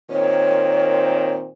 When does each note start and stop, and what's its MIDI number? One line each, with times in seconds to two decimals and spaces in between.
0.11 1.48 46
0.11 1.48 51
0.11 1.48 60
0.11 1.32 73